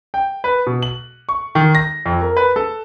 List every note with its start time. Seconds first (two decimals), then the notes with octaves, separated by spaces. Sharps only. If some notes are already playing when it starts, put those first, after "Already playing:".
0.14 G5
0.44 B4
0.67 B2
0.83 F#7
1.29 C#6
1.55 D#3
1.75 A#6
2.06 F2
2.21 A#4
2.37 B4
2.56 A4